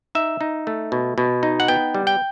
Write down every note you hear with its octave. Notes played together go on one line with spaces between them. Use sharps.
D#4 E5
D#4
A3
B2
B2
D#4
F#5
B3 G5
G3
G5